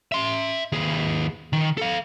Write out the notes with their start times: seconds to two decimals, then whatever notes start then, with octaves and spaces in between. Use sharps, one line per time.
0.12 E5 C6
0.72 D#2 G#4
1.53 D#3
1.78 A4 F5